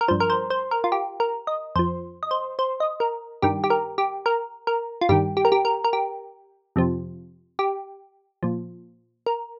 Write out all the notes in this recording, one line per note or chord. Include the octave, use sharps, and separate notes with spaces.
A#4
G2 F3 C5
A#4
C5
C5
A#4
F4
G4
A#4
D#5
F2 F3 C5
D#5
C5
C5
D#5
A#4
G2 D#3 G4
G4
A#4
G4
A#4
A#4
F4
G2 D#3 G4
G4
A#4
G4
A#4
A#4
G4
F2 C3 F3
G4
A#2 F3
A#4